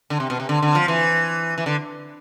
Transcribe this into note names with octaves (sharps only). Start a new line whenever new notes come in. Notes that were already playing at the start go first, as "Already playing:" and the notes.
D3
C3
B2
C3
D3
D3
F3
E3
E3
D3